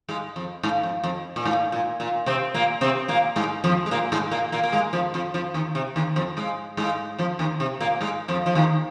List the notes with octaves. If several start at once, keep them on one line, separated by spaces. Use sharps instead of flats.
G#2 G#3
F2
G#2
F2
F2
A#2
G#2
A#2
A#2
C3 C4
A#2 A#3
C3 C4
A#2 A#3
G#2 G#3
F2 F3
G#3
A#2 A#3
G#2 G#3
A#2 A#3
A#2 A#3
A#3
G#2 G#3
F2 F3
F2 F3
F2 F3
D#2 D#3
C3
D#2 D#3
F2 F3
G#2 G#3
G#2 G#3
F2 F3
D#2 D#3
C3
A#2 A#3
G#2 G#3
F2 F3
F3
D#2 D#3